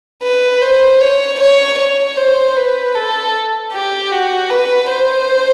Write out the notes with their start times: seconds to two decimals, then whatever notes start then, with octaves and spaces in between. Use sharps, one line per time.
0.23 B4
0.62 C5
1.01 C#5
1.40 C#5
1.79 C#5
2.17 C5
2.57 B4
2.95 A4
3.72 G4
4.12 F#4
4.50 B4
4.89 C5